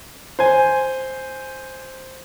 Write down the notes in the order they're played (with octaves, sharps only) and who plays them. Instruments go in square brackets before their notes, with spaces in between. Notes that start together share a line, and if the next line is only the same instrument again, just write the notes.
[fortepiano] C5 G#5